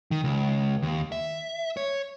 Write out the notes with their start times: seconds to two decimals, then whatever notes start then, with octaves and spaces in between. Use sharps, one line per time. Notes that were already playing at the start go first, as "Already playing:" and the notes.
0.11 D#3
0.24 C#2
0.83 D#2
1.12 E5
1.77 C#5